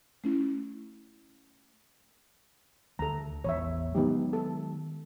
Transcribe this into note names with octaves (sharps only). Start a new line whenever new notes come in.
A3 C#4 E4
D2 A4 A#5
A1 E2 C#5 E5
D#3 F#3 G#3 B3 D#4 G4
A4